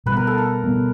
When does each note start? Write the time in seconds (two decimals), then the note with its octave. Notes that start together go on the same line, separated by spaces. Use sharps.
0.06 B2 G3 B3 B4
0.17 A#4
0.27 A4
0.38 A#4
0.64 B2 G3 B3